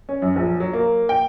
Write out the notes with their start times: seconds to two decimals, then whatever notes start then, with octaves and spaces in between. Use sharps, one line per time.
0.09 C#4
0.22 F#2
0.36 A#1
0.60 F#3
0.73 A#3
1.09 G5